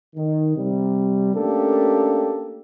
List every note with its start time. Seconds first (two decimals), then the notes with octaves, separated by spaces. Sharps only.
0.16 D#3
0.56 C3 G3
1.34 A3 A#3 C#4 D4 G4 A4